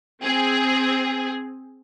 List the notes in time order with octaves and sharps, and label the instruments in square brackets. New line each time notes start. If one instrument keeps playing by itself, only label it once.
[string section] C4 G#4